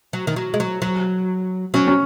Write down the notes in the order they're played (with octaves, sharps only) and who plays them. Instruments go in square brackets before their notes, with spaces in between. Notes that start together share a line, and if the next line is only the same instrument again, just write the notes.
[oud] F#3
D#3
F#3
G#3
F#3
F#3
[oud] F#3 [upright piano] C#4
[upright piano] C#4